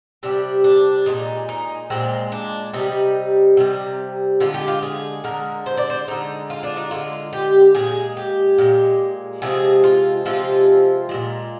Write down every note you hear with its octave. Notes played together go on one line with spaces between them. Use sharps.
C3 G3 D4
D4
A#2 G#3 D#4
D#4
A#2 G#3 C4
D4
C3 G3 D#4
C3 G3
D3 G#3 F4
G4
F4
G#4
D3 G#3 A#4
C5
D5
C5
D3 G#3 D#4
F4
D4
D#4
D3 G#3 F4
G4
A#2 G#3 G#4
G4
A#2 G#3
C3 F3 G#3 G#4
F4
C3 F3 G#3 F4
A#2 F3 G#3